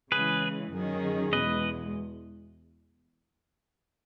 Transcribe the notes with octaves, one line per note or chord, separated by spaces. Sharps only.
C#3 E3 G#3 G#4 B4
F#2 D#3 F#3 C#4 G#4
E2 B2 G#3 B4 D#5